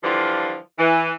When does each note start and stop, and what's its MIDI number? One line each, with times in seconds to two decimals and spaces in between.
0.04 0.57 50
0.04 0.57 52
0.04 0.57 53
0.04 0.57 55
0.04 0.57 65
0.04 0.57 69
0.79 1.12 52